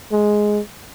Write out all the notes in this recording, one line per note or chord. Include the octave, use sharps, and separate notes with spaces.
G#3